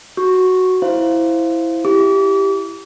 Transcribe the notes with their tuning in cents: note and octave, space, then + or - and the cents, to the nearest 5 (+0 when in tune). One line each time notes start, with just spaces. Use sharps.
F#4 +0 C#6 +0
E4 +0 C5 +0 F5 +0
E4 +15 G4 +0 D6 -35